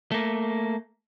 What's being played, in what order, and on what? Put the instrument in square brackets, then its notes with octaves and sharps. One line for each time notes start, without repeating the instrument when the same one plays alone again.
[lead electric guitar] A3 A#3